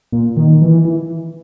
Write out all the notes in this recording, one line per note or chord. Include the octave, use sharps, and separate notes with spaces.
A#2
D#3
E3
E3